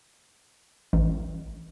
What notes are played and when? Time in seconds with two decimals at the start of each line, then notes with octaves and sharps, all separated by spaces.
0.93 A1